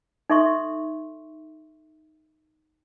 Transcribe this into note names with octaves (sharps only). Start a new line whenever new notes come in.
D#4 A4 E5 C6 C#6